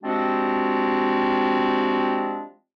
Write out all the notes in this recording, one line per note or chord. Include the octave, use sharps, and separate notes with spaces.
F3 G3 G#3 C4 D4 F#4